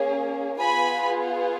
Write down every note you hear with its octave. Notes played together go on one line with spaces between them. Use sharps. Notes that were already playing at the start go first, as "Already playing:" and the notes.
Already playing: A#3 C#4 G#4
B3 F4 G#4 G#5 B5